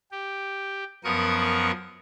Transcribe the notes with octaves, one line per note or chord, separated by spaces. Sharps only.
G4
F#2 F3 B3 A#4 C#6 D#6